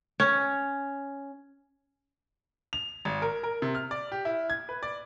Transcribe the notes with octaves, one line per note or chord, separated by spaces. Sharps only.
C#4
F7
G#1
A#4
A#4
C3
F6
D5
G4
E4
G#6
B4
D5